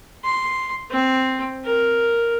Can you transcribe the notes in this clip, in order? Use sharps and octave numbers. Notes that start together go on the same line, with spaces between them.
C6
C4
A#4